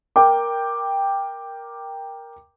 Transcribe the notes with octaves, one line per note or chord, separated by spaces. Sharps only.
A#4 G5 D6